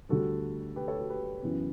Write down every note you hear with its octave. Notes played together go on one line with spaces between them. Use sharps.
D2 D3 G3 F#4 A4
G4 B4
A4 C#5
F#4 A4
G4 B4
F#1 F#2 E3 B3